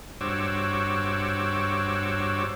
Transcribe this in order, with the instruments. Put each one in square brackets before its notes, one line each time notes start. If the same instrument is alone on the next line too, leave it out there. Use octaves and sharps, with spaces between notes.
[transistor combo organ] G2 F#4 C5 C#5 D6 E6